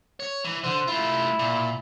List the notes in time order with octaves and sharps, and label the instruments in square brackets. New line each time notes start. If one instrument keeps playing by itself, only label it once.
[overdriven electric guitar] C#5
E3
[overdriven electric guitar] D3 [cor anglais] C5
[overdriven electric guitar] A3 F4 [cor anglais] E4
[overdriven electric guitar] A#2